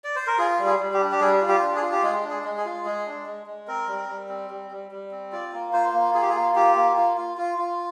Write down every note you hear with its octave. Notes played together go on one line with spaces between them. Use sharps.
D5
C5
A#4
F4 G#4
G3
G#4
G3
G4
D4
G4
G3 G#4
F4
G4
D4
G#4
F4
G4
G#3 G#4
D4
G#4
G#3
G#4
F4
G#3 G#4
D4
G#3
G#3
C4 A#4
G3
G3
C4
G3
G3
G3
C4
F4 D5
A#3
F4 C5
A#3
F4 G#4
G4
G#4
A#3
F4 G4
A#3
F4
F4
F4
F4